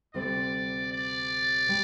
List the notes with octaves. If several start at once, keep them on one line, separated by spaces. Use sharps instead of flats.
D2 C3 G3 C4 D5
D5
G3